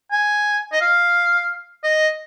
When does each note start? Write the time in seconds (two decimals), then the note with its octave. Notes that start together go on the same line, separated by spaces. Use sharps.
0.12 G#5
0.72 D#5
0.81 F5
1.84 D#5